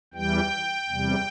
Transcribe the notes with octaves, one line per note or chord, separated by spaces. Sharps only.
E2 E3 G3 G5
E2 C3 G3